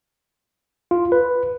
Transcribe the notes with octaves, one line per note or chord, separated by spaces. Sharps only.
F4
B4